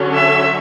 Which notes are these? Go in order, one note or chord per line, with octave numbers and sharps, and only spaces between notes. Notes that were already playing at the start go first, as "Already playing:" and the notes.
Already playing: D3 F#3 C#4
E5